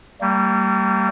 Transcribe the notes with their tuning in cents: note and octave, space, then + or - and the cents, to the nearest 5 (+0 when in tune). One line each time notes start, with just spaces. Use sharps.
G3 -15 A#3 -40